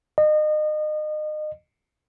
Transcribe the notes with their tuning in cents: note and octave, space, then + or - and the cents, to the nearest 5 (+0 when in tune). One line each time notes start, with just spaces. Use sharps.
D#5 -30